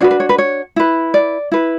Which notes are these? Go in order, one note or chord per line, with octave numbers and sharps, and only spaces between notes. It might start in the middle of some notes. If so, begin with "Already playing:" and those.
D4 F#4 B4 C#5
B4
C#5
B4
C#5
E4 B4
D5
E4 B4